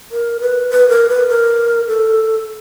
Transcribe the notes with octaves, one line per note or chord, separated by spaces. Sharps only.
A#4
B4
B4
A#4
B4
A#4
A4